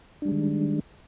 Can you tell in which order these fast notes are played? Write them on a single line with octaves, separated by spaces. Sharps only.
D4 G3 G#3 D#3